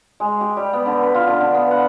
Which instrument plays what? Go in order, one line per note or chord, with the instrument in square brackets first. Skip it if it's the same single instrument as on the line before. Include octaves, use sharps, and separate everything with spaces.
[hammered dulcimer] G#3
G4
G3
B3
D3
B4
F4
D3
D3
B3
F#5